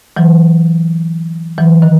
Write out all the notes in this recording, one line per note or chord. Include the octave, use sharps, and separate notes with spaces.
E3 F#3
E3 F#3
D#3